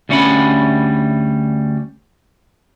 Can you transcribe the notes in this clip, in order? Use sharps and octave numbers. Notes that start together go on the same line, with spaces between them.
D2 G3 C#4 E5 F#5 B5